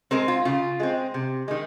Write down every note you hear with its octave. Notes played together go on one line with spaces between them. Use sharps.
G#3 C4 A#4
F4
C#3 F4
G#3 C4
C3
D#3 G#3